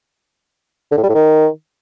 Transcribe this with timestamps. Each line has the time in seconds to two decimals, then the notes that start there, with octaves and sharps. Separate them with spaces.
0.92 D3
0.98 A2
1.03 G3
1.09 A2
1.15 D#3